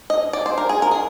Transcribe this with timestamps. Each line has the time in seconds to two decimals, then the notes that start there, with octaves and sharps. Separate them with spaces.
0.10 D#5
0.33 D5
0.46 C5
0.58 A#4
0.69 G#4
0.82 A#4
0.91 G#4